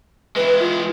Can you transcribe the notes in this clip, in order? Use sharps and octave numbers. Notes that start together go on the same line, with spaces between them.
E3 G#3 B4
F4